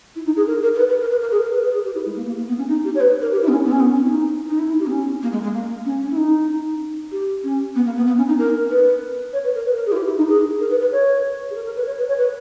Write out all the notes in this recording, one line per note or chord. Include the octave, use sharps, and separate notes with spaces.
E4
D#4
G#4
A#4
A#4
A#4
B4
B4
A#4
B4
A#4
G#4
A#4
B4
B4
G#4
G4
E4
G#3
A#3
A#3
A#3
B3
C#4
D#4
G4
C#5
B4
A#4
G4
E4
B3
C#4
B3
C#4
B3
C#4
E4
D#4
D#4
E4
E4
G4
B3
C#4
A#3
G#3
G#3
A#3
C#4
C#4
E4
D#4
G4
C#4
B3
A#3
B3
B3
C#4
D#4
A#4
B4
C#5
B4
A#4
B4
A#4
G#4
E4
G4
E4
D#4
G#4
A#4
B4
B4
C#5
G#4
A#4
A#4
B4
C#5
B4
C#5
B4